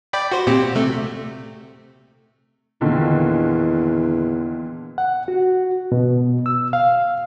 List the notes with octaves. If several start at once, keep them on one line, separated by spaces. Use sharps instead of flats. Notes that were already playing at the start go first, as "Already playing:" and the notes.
D5 G5 B5
F#4 C5
A#2 C4 G4
C3 A3
E2 A#2 D3 D#3
F#5
F#4
B2
E6
F5